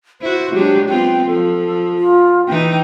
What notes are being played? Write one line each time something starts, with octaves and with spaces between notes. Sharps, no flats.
E4 F#4 C5
F#3 G#3 D4 G4
B3 C4 F4 G5
F3 A4
F4
E3 D#4 G5